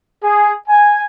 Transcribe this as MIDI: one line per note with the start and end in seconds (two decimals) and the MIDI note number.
0.22 0.51 68
0.68 1.04 80